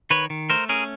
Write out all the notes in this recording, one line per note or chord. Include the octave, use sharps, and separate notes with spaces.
D#3 B4 C#5
D#3
A3 A#4 C5
C#4 G#4 A#4